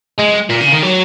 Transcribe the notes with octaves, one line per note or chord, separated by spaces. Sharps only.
G#3
A#2
C#3
D#3
F#3